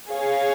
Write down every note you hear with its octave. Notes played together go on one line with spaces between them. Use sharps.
G#4 C#5 F5